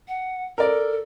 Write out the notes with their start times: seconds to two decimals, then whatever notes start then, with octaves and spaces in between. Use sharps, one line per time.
0.08 F#5
0.58 A4 A#4 D5